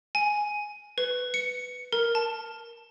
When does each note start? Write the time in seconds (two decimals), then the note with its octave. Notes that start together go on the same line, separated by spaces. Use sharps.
0.15 G#5
0.98 B4
1.34 C#7
1.92 A#4
2.15 A5